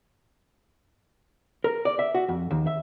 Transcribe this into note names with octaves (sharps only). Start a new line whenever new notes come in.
A#4
D5
E5
F#4
F2
D#2
E5